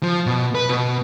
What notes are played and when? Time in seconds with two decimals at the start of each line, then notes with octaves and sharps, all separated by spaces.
0.03 F3
0.26 B2
0.55 B4
0.70 B2